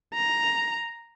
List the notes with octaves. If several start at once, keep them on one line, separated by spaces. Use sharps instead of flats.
A#5